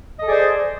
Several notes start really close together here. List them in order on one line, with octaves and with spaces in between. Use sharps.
D#5 A4 G#4 D5 C5